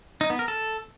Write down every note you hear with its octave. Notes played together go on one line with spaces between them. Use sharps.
D#4
B3
A#4
A4